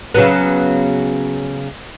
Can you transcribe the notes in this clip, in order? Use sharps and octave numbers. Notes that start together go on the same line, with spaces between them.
C#3 F#3 B3